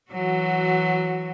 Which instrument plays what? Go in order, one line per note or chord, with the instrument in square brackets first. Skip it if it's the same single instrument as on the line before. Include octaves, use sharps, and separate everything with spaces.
[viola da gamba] E3 F#3 F#4